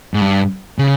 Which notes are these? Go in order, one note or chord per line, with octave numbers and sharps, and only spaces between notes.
G#2
G2
C#3